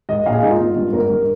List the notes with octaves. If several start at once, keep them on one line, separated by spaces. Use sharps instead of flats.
G#2 D#3 D#5
A#1 F5
G#4
G#2 D#3 D#4
F4
G#1
G2 D#3
G#1 A#4
G2 D#3